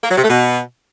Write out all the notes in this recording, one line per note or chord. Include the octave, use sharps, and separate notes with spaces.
A#3
F#3
C3
A3
B2